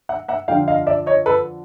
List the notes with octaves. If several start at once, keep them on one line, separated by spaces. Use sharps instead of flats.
E5 F#5
E5 F#5
F2 D3 F3 F5 G5
D#5 F5
D5 E5
C#5 D#5
A4 B4